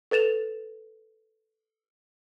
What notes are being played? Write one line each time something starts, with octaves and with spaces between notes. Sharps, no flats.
A4 B4 A6 E7 F7